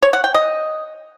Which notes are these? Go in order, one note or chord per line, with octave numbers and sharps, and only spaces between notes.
C#5
F#5
G5
D#5